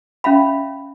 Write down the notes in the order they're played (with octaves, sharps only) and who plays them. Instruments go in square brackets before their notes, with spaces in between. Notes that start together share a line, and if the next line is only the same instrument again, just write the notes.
[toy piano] C#4 E5 F5 B5